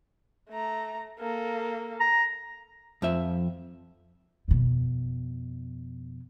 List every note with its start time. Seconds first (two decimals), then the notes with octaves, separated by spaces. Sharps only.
0.50 A3 A#5
1.19 A#3 A4
2.00 A#5
3.02 F2 F3 E5
4.48 F2 B2